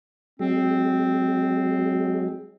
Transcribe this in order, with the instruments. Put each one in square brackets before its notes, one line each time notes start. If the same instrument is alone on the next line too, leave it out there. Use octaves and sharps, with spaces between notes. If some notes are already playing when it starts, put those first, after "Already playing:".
[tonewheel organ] F#3 G#3 [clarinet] C4